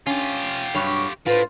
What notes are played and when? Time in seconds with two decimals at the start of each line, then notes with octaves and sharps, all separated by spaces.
0.07 C#4 F4 G4
0.75 G2 F#3 C#5
1.26 A2 F4 B4 C5